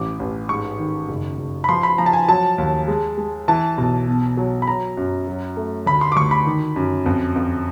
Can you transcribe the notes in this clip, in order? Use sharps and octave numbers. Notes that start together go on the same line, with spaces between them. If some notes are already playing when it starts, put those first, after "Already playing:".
Already playing: A1 E3 D6
A1
G#2 C#6
D#3
F#1
F#1
B5
F3 C6
B5
F3 A#5
A5
G#5
F#3 A5
D#2
G#3
G#3
E3 A5
B1
B2
F#3
B5
F#3 A#5
F#2
F#3
A3
D2 B5
C6
D6
D2 C#6
B5
D#3
F#2
F2
F2